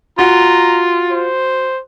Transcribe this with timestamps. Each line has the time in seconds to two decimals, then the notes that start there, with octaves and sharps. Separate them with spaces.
0.19 F4 F#4 A#5
1.11 C5